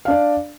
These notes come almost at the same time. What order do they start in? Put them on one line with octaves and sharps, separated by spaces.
F5 D4 D5